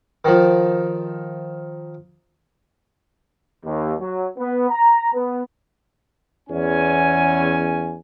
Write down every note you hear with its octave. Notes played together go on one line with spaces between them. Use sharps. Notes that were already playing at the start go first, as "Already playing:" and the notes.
D#3 F3
D#2
F#3
B3
A#5
B3
E2 C#4 G#5